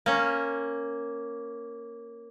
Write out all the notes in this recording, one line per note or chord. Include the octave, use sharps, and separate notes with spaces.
A#3 C#4